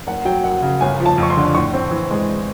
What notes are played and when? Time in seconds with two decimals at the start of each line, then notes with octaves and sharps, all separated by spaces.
0.07 F#1 F#5
0.25 F#3 G5
0.44 F#2 F#5
0.62 C#3
0.81 G1 G#5
1.00 F3
1.06 A5
1.18 F2
1.23 C#6
1.30 C6
1.37 D3
1.55 A2 C#6
1.74 C4
1.91 E3
2.11 G#3